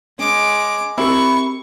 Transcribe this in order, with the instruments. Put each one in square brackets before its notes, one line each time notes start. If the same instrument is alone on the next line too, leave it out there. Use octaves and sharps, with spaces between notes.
[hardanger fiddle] G#3 D6 [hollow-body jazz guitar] C#4
[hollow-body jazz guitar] C4 G4 A#4 [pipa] E4 [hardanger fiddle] C#6